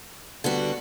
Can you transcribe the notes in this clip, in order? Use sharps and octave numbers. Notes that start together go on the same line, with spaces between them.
D3 G3 B3 F#4